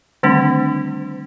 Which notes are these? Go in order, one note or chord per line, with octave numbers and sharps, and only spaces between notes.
D3 D#3 G3 A3 C4 D4